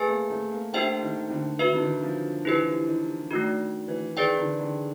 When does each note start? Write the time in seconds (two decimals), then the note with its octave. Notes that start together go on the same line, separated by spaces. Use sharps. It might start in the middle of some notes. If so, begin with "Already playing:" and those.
Already playing: A3 G#4 B4 E5 G#5
0.08 A#3
0.30 A3
0.52 A#3
0.73 A3 D4 G4 C5 E5 G5
1.02 D#3
1.30 D3
1.59 E3 F#4 B4 E5
1.67 D#3
1.75 D3
1.82 D#3
2.03 F3
2.44 E3 E4 G4 B4
2.88 D#3
3.31 D#3 A3 D4 F#4
3.88 E3
4.16 D#3 G#4 B4 D5 G5
4.38 D3
4.59 D3